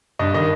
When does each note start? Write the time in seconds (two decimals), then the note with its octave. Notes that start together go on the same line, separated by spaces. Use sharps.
0.19 G2 D#5
0.34 D#3 D#5